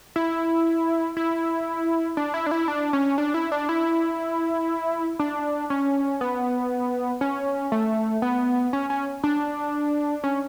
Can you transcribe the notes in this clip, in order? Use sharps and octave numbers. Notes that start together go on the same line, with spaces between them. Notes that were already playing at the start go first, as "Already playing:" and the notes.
E4
E4
D4
E4
D4
E4
D4
C#4
D4
E4
D4
E4
D4
C#4
B3
C#4
A3
B3
C#4
C#4
D4
C#4